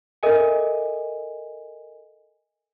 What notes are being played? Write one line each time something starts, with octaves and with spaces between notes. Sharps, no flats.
A4 A#4 D#5 E5 G#5